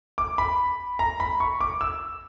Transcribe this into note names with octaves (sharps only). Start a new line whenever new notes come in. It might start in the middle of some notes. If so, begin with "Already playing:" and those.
D6
B5
A#5
B5
C#6
D6
E6